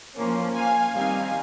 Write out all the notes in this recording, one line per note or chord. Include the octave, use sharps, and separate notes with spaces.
F3 A#3 C#4
F5 G#5
D#3 G3 C4 D#4 F5 G#5